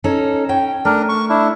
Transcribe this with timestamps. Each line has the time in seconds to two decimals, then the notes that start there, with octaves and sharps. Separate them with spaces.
0.04 C#4 D#4 A4
0.49 C#4 G5
0.85 A3 D4 A#4
1.09 C#6
1.30 D4 E4